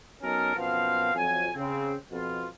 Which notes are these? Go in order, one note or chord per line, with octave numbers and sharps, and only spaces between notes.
F#3 B3 C#4 D#4 A4 A#4
F#2 B2 F3 B3 C4 F5
F2 F#3 G#5
C#3 C4
F2 B2 F4